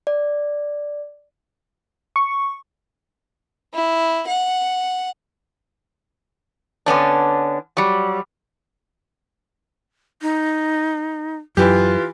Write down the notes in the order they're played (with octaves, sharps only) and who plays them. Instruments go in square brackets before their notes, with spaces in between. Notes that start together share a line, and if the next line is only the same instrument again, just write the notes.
[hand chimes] D5
[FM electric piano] C#6
[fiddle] E4
F#5
[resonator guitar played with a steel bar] D3 B3 C#4 D4
F#3 G3
[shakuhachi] D#4
[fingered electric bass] F#2 [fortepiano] E3 G4 [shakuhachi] F4